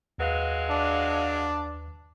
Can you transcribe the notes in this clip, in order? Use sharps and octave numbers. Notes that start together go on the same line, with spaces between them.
D#2 F#3 G#3 B4 F5 F#6
D4